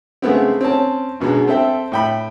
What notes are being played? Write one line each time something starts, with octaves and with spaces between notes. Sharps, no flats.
C#3 G#3 A3 B3 C4
C4 C#4 A5
F#2 B2 D3 G#3
C4 A4 E5 G5
A2 G5 B5